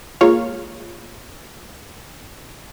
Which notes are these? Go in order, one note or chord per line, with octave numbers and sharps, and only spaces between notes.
G#3 A#3 F4 C#5 F5